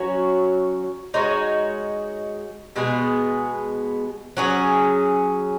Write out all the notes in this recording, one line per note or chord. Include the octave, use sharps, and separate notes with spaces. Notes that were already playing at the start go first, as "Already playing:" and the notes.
Already playing: F#3 C#4 F#4 C#5
G#3 D#4 F#4 C#5
B2 G#3 B3 G#4
F#3 C#4 G#4